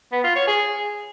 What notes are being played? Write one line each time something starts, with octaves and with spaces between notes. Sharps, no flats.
B3
F4
C#5
G#4